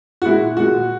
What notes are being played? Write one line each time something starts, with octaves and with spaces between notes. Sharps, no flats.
F#4
A#2 G#3 E4
A#2 G#3 F#4